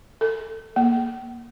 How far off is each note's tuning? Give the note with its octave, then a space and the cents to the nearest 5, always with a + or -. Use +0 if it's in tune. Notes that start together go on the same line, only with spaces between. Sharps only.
A4 +20
A#3 +10